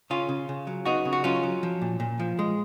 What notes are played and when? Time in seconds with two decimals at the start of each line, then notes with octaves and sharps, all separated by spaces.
0.10 C#3 C#4 F4
0.29 C#3
0.49 C#3
0.67 F#3
0.85 B3 D#4 F#4
1.05 C#3
1.13 F#4
1.24 F#3 C#4 F4
1.43 F#3
1.63 F3
1.82 A#2
2.00 A#2
2.20 F3
2.39 G#3